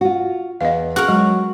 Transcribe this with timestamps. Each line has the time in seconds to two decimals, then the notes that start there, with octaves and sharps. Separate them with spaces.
0.01 F4 F#4
0.61 E2 D#5 F5
0.96 F#4 G#4 A#4
1.08 F#3 G#3